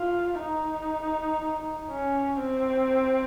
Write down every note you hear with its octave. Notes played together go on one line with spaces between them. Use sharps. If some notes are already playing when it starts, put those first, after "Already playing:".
Already playing: F4
D#4
C#4
C4